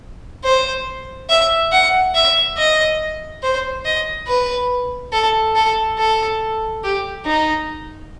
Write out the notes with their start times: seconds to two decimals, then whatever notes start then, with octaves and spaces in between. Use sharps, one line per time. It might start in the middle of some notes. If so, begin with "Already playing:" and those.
0.45 C5
1.30 E5
1.72 F#5
2.15 E5
2.58 D#5
3.43 C5
3.85 D#5
4.27 B4
5.13 A4
5.56 A4
5.99 A4
6.84 G4
7.26 D#4